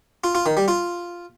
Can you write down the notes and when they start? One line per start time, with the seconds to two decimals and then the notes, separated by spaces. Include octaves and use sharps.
0.24 F4
0.35 F4
0.46 D#3
0.57 G3
0.68 F4